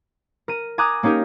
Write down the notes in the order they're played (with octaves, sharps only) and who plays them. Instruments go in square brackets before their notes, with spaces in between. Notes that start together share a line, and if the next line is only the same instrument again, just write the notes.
[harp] A#4 D#7
G#5 A#5 D6 D#6 F#6
A#3 C#4 D#4 G4 A#4